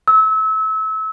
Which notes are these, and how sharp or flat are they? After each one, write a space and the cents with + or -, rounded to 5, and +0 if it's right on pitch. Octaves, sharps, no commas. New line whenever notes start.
E6 -30